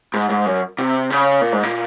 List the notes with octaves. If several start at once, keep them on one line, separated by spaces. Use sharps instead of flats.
G#2
G#2
F#2
C3
C#3
A#2
G#2
A#2